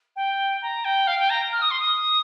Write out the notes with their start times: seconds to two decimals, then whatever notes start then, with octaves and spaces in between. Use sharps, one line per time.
0.15 G5
0.62 A#5
0.84 G5
1.07 F5
1.18 G5
1.29 A#5
1.52 F6
1.61 D#6
1.70 C6
1.79 D#6